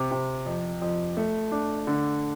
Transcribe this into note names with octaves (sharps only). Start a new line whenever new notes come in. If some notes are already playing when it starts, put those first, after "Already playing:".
Already playing: C3
C3
F2
F2
A3
D4
D3